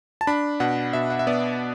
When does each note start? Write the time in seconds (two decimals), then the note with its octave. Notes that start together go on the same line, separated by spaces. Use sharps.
0.21 A5
0.27 D4 B5
0.60 B2 F#5
0.93 B2 E5
1.10 F#5
1.19 E5
1.27 B3 D5